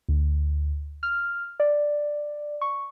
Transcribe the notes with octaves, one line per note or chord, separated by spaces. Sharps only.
D2
F6
D5
C#6